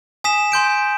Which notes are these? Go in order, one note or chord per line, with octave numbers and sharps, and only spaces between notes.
G#5 D#6 B6 E7
G#5 C6 G6 D7